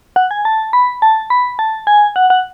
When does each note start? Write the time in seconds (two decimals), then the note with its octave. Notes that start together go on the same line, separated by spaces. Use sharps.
0.16 F#5
0.31 G#5
0.45 A5
0.73 B5
1.02 A5
1.30 B5
1.59 A5
1.87 G#5
2.16 F#5
2.30 F#5